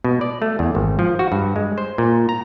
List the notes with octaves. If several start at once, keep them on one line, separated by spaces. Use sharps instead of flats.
B2
D5
A3
E2
G#1
F3
F#4
G2
G#3
C5
A#2
A#5